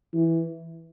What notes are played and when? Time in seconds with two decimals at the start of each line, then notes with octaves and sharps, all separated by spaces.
0.14 E3